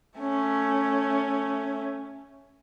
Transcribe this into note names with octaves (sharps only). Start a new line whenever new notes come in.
A3 C#4